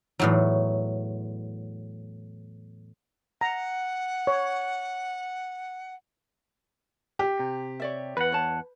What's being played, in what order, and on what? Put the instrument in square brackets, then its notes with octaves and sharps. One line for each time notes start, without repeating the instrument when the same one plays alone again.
[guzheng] E2 A2 F#3
[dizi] F#5 [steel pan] A#5
[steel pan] C#5
[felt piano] G4
[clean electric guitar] C3
[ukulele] C#5 D5 E5
[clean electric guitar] E2 F#5 [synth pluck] B4
[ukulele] C#5 A5